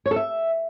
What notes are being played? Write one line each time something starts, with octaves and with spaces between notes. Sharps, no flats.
C#5
A4
E5